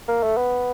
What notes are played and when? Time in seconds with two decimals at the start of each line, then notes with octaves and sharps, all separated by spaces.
0.09 A#3
0.23 A3
0.38 B3